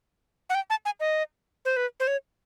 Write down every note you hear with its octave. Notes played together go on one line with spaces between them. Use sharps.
F#5
G5
A5
G#5
D#5
C5
B4
C5
C#5